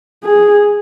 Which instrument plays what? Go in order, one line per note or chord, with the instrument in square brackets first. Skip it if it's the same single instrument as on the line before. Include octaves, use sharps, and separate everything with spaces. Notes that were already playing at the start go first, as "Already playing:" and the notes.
[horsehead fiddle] G#4